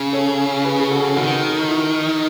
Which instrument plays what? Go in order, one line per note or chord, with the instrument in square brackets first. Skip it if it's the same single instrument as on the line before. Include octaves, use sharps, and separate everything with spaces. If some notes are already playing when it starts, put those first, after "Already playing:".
Already playing: [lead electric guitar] C#3
[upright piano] A4 C#5
G#4 B4
G#4
F#4 A4
[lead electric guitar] D#3 [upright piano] F#4
[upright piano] E4
E4